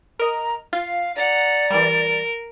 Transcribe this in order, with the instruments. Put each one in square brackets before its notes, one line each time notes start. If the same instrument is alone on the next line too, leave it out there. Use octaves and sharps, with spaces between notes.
[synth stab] A#4 D#5 [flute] A#5
[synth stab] F4 [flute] F5
[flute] D5 [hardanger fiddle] F#5 A#5
[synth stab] E3 G3 [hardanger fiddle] A#4